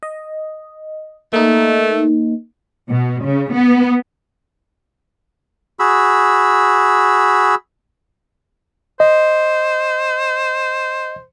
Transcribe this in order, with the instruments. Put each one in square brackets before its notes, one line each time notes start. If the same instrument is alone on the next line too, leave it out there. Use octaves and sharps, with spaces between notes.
[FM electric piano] D#5
[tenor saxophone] A3 [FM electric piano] A#3 D#4
[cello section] B2
C#3
B3
[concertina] F#4 G#4 B5 E6
[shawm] C5 [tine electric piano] D#5